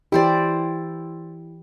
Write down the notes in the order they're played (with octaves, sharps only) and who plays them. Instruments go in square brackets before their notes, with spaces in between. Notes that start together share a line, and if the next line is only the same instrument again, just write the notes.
[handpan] E3 G4 [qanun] E4 C5 D5